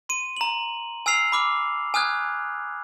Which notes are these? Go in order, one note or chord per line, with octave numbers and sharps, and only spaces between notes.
C6 D#7
A#5 F#7
G#5 E6 F6 C7 F7
B5 D6 F6 C7
G#5 D#6 F6 F#6 G#6